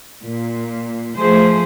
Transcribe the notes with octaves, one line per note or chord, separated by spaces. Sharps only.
A#2
F3 A3 G#4 C5